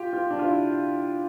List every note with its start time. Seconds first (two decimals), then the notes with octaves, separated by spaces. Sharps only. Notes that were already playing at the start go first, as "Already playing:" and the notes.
Already playing: F4 G4
0.13 F4
0.31 D4
0.39 F4
0.47 E4